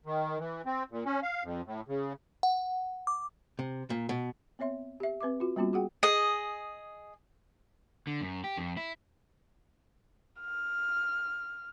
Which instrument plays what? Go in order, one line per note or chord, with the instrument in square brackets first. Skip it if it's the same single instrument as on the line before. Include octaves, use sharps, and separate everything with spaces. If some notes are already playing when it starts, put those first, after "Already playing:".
[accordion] D#3
E3
C4
A#2
C#4
F5
F2
A2
C#3
[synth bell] F#5
D6
[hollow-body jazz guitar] C3
A#2
B2
[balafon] B3 C4 C#5 E5 C6
G4 E5
C4 B4 E5 D6
F4 F#4
G3 A#3 B3 C#4 F4 F#4
F#4 G#4 F#5 G5
[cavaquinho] G#4 D#5
[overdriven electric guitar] D3
F#2
G4
F2
E4
[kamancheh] F6